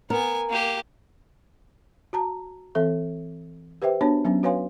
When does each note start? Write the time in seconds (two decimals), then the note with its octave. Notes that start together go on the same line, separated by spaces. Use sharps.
0.10 B3 A#4 G#5
0.50 A#3 G4
2.13 F#4 A5 A#5
2.75 E3 C4 A4 E5
3.82 G4 B4 C5 E5 G5
4.01 B3 D4 F#4 C#5 A5
4.25 F#3 B3 C#4
4.43 F#4 B4 C#5 F5 G#5 C6